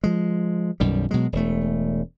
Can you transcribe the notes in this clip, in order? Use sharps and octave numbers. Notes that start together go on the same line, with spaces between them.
F3 G#3
B1 F#2 D#3 G3
B2 F#3 G#3
E1 A3